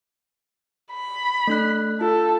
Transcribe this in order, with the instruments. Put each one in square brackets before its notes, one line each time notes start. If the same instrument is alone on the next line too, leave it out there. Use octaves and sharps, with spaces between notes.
[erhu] B5
[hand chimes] A3 D4 F#6
[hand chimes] F4 [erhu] A4